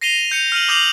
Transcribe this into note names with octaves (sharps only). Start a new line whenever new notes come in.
A#6 C7 D#7 F7 G7
G6 C#7 F7
F6 D#7 F#7
D6 D#6 G6 C7 F7 F#7